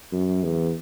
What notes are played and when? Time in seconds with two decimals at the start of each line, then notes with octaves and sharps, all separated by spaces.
0.13 F#2
0.44 E2